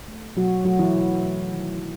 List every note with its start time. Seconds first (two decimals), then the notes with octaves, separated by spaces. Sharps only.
0.08 A3
0.37 B2 F#3 F#4
0.65 F#3 A3 F#4
0.79 E3 E4
0.94 B2
1.22 A3
1.51 D#3
1.79 F#3